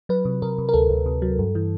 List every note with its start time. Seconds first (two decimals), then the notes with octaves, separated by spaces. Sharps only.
0.09 F#3 B4
0.25 C3
0.42 C3 A#4
0.58 C3
0.69 A#4
0.74 D2 A4
0.90 D2
1.06 C3
1.22 F#3
1.39 G2
1.55 E3